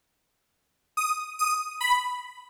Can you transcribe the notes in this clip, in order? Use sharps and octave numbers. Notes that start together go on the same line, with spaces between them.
D#6
D#6
B5